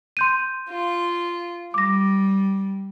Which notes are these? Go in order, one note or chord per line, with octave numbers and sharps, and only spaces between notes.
C6 G6 D#7
F4
G3 D6 A#6